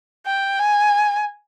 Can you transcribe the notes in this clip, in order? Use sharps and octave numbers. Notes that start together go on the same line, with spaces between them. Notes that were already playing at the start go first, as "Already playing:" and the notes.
G5
G#5